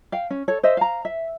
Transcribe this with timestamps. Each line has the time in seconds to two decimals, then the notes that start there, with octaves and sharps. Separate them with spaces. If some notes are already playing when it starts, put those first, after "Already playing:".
0.12 F5 G5
0.30 C#4
0.48 A4 C#5
0.63 C5 D#5 E5
0.77 F5 A#5
1.05 E5